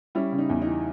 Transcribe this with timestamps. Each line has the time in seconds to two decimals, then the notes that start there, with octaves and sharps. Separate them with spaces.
0.15 G3 C#4 E4
0.32 C#3
0.38 D#4
0.49 E2
0.62 D#4
0.67 E3